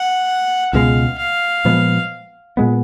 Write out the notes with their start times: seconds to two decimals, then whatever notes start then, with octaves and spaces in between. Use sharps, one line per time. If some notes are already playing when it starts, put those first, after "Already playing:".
Already playing: F#5
0.73 C#2 B2 G#3 F5
1.19 F5
1.65 A#2 F3 G#3 B3
2.57 A#2 G#3 B3